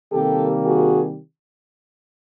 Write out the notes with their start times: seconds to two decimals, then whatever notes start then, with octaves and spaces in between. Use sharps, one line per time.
0.13 C3 D#3 G3 A#3 G4 A4
0.65 F#4 G#4